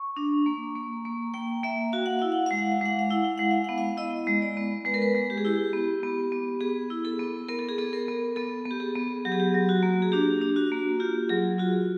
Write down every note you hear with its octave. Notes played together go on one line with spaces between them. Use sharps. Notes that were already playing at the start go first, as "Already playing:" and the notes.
Already playing: C#6
D4
A#3
A#3
A#3
A#3 G5
A#3 E5
F#4 F5
F#5
E4 F5
F#5
G#3 F5
F#5
F5
G#3 F#5
F5
E4 F#5
F5
G#3 F#5
F5
B3 F#5
F5
E4 D#5
G#3
D5
B3
G#3 B4
A#4
B4
G#3
G4
G#4
E4 G4
B3
B3
B3
B3 G#4
E4
A4
B3
B3 A#4
A4
G#4
B3 A4
A#4
B3
B3 A4
B3
G4
G#4
B3
F#3 G4
G#4
G4
F#3
F#4
A#3
G#4
D4 G4
D4
F#4
A#3
F4 G4
F#3 G#4
F4 F#4